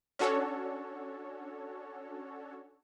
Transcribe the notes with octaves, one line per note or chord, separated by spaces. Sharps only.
C#4 D4 F#4 A4 C#5